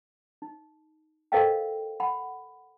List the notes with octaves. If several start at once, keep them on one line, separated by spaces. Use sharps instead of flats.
D#4
A4 A#4 C5 D#5 F5 G5
F#5 B5